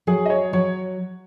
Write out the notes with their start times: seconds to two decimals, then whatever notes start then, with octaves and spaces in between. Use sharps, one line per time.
0.07 F#3 G#4
0.26 D#5
0.30 C#5
0.53 F#3 C#5